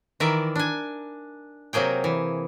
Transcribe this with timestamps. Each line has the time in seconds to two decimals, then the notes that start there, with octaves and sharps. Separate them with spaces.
0.20 D#3 E3 A#4 D5 E5
0.56 D4 G#5
1.73 C3 F#3 A#3 G#4 G5
2.04 E3